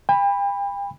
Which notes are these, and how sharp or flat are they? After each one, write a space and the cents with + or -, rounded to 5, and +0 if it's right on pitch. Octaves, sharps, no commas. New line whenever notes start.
G5 +40 B5 +0